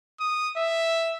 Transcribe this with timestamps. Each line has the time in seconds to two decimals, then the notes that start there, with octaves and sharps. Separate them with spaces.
0.20 D#6
0.57 E5